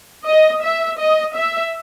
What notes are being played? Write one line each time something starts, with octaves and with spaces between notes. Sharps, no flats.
D#5
E5
D#5
E5